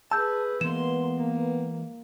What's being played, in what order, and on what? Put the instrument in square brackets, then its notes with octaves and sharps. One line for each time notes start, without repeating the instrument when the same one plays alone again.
[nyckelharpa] G#4 B4 [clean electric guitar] A5 [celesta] E6 G6
[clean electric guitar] E3 G#3 [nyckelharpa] A#3 C6 [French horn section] B3 [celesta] E7
[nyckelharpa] A#3